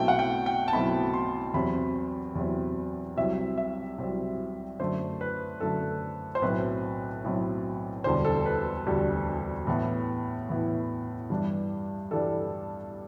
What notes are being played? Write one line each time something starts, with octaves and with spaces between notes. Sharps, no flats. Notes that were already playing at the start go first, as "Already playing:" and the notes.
Already playing: B1 B2 A3 C4 E4 G5
F#5
G5
G5
A5
B1 B2 A3 C4 E4 B5
C6
E2 C3 F#3 C4 E4 B5
E2 C3 F#3 C4 E4
C2 C3 F#3 C4 E4 E5
E5
C2 C3 F#3 C4 E4
F#2 D3 A3 C5
B4
F#2 D3 A3 A4
C5
B1 A2 F#3 C4 E4 B4
B1 A2 F#3 C4 E4
E1 D2 D3 G3 C5
A4
B4
E1 D2 D3 G3 G4
A2 E3 B3 E4
A2 E3 B3 E4
G2 E3 G3 D4
G2 E3 G3 D4 A4